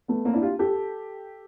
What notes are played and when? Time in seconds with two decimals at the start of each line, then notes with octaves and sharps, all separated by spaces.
0.08 A3 B3
0.25 A#3 C4
0.33 D4 E4
0.42 F4 G4
0.59 G4 A4